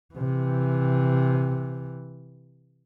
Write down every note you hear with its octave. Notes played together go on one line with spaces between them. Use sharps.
C3 E3